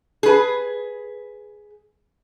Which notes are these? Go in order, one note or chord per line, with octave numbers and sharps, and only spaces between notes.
G#4 B4